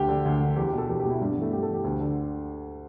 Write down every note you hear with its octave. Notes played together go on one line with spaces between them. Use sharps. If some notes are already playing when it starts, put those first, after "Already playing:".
Already playing: D2 G4
D3
D2
D3
E2 G4
G4
B2 A4
E2 G4
G4
B2
E4
G2 D4
B3
E3
A3
G2 G4
A4
E3
G4
D2
D3